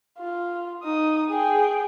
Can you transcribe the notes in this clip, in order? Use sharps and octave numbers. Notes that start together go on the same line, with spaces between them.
F4
D#4 D#6
G#4 G5